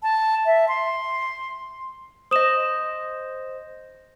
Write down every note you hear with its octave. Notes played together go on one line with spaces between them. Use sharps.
A5
E5
C6
C5 D#5 D#6 E7